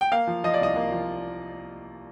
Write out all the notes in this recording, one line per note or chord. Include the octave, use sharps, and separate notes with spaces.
G5
A#3 F5
F3
F3 D#5
D5
C2 D#5
A#3
F3